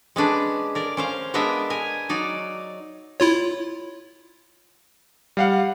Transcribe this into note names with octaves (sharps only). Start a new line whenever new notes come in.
G#3 C#4 D4 B4
A#4 D5
C#4 C5 F5
G#3 B3 D4 A#4 D#5 E5
A#4 G#5
F#3 D#4 D5
E4 F4 C#5
G3 F5 F#5